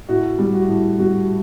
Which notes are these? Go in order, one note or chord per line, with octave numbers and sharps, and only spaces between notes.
A2 F#4
G3
F#4
A2
G3 F#4